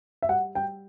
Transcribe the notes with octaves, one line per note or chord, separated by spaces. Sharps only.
E5
G3 F#5
G3 G5